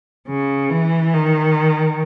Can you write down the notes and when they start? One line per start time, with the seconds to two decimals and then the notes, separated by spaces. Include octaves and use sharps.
0.28 C#3
0.70 E3
1.13 D#3